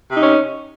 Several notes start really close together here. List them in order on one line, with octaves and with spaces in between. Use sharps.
C3 D#4 C#4